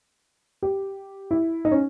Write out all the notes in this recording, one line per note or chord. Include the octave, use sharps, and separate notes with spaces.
G4
E4
D#4
C#4